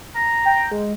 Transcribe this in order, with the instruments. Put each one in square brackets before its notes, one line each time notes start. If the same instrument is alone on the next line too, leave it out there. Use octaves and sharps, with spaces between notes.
[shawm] A#5
[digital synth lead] G5
G#3